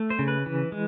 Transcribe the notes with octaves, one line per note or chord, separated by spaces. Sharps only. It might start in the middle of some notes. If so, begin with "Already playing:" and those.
Already playing: A3
C5
C#3
B4
E3
G#3